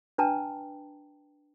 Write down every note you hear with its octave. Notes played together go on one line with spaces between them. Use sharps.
D4 B4 G5 A5 A#5